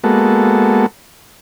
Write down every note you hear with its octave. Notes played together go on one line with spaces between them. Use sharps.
G#3 A#3 B3 F#4 A4